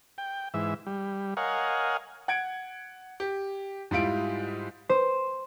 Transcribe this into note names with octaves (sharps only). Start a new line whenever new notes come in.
G5
G#2 E3 E5
G3
A#4 C#5 D#5 F5 F#5 G#5
F#5 G#6 D7
G4
G#2 G3 E4 F4 D7
C5